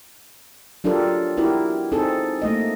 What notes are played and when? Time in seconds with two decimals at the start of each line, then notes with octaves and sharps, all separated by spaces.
0.84 F#3 D4 F4 G4 A4 A#4
1.37 B3 E4 F#4 G4 A#4
1.92 C4 D#4 G#4 A4
2.42 A3 A#3 D#5